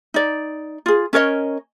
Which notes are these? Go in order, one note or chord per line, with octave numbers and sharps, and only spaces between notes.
D#4 D5
F4 G#4
C#4 A#4 C#5 D#5